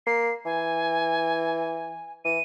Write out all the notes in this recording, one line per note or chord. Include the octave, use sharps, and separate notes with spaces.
A#3 C7
E3 G#5
E3 D#7